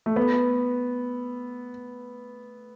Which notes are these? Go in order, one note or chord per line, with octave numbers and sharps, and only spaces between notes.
A3
B3